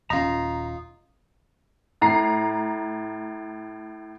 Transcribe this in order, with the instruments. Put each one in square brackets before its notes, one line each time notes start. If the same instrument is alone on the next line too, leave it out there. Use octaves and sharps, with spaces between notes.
[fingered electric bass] D#1 C#4 [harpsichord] D#4 F4 [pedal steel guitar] A#5
[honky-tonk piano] A2 A#5 C7